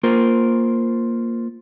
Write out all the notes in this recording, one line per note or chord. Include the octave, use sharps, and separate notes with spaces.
A#3 F4 A#4 C5